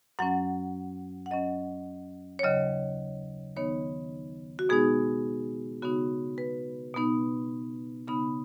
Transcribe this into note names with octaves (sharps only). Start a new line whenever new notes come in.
F#2 F#3 C#4 F#5
F#5
F#2 F#3 C#4 D#5
C#5
D#2 C#3 F#3 D#5
D#2 D#3 B3 D#4 C#5
F#4
B2 G#3 B3 D#4 G#4
C#3 B3 D#4 F#4
B4
B2 B3 D#4
C#3 B3 D#4 B5